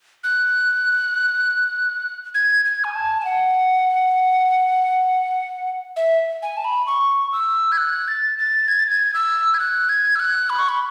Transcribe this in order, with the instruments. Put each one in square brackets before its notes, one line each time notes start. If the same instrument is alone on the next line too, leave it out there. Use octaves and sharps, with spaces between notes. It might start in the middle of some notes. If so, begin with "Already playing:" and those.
[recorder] F#6
G#6
G#6
G#5
A5
G#5
F#5
E5
G#5
A5
B5
C#6
E6
G#6
F#6
A6
A6
G#6
A6
G#6
E6
G#6
F#6
G#6
E6
F#6
B5
C#6
B5